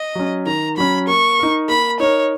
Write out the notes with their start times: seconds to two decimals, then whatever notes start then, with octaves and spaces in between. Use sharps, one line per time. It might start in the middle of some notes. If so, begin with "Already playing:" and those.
Already playing: D#5
0.15 F#3 C#4
0.46 D#3 A#5
0.77 F#3 C#4 B5
1.07 A#3 C#6
1.39 D#4 A#4
1.69 A#3 B5
2.00 D#4 A#4 C#5